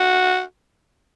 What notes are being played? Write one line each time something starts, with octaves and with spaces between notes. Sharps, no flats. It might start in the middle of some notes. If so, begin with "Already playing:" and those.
Already playing: F#4